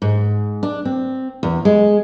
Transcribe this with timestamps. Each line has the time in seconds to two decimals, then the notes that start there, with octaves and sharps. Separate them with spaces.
0.02 G#2
0.63 D4
0.85 C4
1.43 E2
1.65 G#3